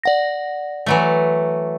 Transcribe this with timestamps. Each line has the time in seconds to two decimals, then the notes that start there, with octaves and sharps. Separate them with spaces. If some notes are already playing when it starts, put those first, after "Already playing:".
0.03 D5 F#5 A#6
0.86 E3 F#3 A3